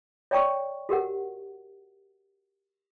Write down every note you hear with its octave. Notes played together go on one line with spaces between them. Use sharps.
C#5 D5 G5 A#5 C#6
F#4 G4 A#4 F#5